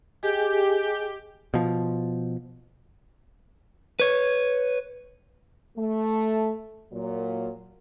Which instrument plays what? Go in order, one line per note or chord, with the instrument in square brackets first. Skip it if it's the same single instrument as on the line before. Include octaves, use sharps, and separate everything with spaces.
[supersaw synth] G4 G6 [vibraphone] G#4 D#5 G#5
[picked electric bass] B2 F3
[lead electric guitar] B4 C#5
[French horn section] A3
A#2 F#3